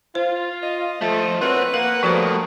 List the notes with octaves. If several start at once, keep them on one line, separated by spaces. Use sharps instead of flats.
F4 C5
D#5
F3 A3
C4 F#4 A#4 B4 C#5
A#3 A#4 F#5
F3 G3 A3 B3 F#4 C5